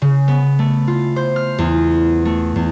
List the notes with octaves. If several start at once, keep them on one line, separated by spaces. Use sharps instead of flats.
C#3
B3
A3
F4
C5
F6
E2
A3
E2